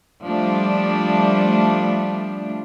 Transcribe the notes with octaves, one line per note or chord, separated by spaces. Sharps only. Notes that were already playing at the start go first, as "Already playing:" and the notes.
F3 G3 A3 D4